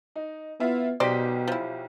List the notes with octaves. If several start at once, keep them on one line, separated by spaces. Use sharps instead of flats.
D#4
B3 E4 F4
B1 B2 G4 C5 D5 D#5 B6
F3 E4